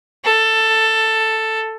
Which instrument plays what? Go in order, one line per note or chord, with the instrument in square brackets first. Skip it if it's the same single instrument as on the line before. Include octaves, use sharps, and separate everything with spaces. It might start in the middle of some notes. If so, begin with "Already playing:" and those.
[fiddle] A4